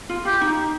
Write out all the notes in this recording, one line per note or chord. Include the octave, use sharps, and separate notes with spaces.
F4
F4 G4
D#4